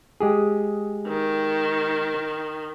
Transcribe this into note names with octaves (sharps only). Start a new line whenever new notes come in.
G#3 G4 G#4
D#3